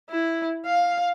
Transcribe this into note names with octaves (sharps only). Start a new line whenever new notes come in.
E4
F5